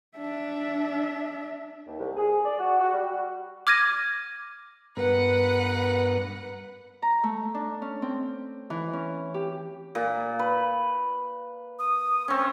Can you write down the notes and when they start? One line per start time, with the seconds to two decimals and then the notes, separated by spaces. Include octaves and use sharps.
0.17 D4 E5
1.87 D#2
1.99 C2
2.17 G#4
2.45 D5
2.59 F#4
2.80 F#4
2.93 G3
3.10 F#4
3.67 D6 F6 G#6 A#6 D#7
4.97 G2 B3 A#4 B4 F#5
7.02 A#5
7.23 A3
7.54 D4
7.82 C#4
8.02 C4
8.70 E3
8.93 C#4
9.34 G4
9.95 A#2
10.39 B4
11.79 D#6
12.28 C4 C#4 C#6